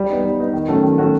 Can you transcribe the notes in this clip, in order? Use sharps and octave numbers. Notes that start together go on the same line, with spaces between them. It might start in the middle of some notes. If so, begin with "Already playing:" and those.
Already playing: G3
B3 D#4
G3
B3 D#4
D#3
F#3 A3 C#4 F#4
D#3
F#3 A3 C#4 F#4